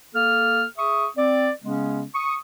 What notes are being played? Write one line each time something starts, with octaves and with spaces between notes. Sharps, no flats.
A#3 A4 F6
G#4 E5 C#6 D#6
C4 D5
C#3 G#3 B3 C#4
C#6 D#6